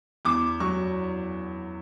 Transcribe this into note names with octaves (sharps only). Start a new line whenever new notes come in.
E2 D6
F#3 C#6